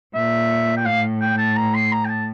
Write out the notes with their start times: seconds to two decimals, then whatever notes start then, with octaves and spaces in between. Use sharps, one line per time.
0.14 A#2 E5
0.77 G5
0.85 A2 F5
1.21 G5
1.38 A5
1.56 A#5
1.74 C6
1.92 A#5
2.05 G5
2.09 A5